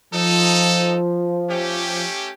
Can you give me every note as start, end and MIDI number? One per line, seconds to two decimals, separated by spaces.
0.14 2.04 53
0.14 0.98 63
0.14 0.98 69
1.51 2.30 57
1.51 2.30 61
1.51 2.30 67